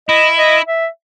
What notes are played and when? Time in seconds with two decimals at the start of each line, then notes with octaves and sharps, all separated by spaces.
0.08 E4 D#5
0.38 D#5
0.67 E5